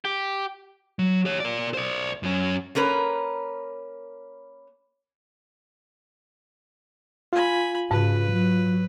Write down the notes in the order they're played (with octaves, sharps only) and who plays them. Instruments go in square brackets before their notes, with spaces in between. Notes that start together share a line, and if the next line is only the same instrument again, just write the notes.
[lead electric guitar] G4
F#3
G4 C#5
A#4 D5
C5 D5
F#2 C#4
[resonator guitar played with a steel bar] A#3 C#4 A#4 B4
[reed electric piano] F4 [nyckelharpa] G#5 B5
[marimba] G#2 [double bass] C#3 [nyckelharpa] B4
[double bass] F#3